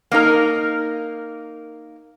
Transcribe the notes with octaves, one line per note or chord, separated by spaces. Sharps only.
A#3 D#4 A#4